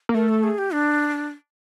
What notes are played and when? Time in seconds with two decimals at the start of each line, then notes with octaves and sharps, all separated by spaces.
0.09 A#3
0.14 A3 A#4
0.29 A4
0.44 G#4
0.58 G4
0.73 D4